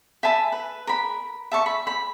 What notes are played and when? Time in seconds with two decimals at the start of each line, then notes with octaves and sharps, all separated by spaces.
0.23 E5 G#5 A5 B5
0.52 B4
0.87 A#4 B5
1.52 E5 A5 C#6
1.66 B5
1.87 B5